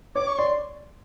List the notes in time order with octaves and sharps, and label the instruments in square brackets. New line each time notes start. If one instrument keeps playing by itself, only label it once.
[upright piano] C#5 [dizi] D6
[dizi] C#6
[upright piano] D5 [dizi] C6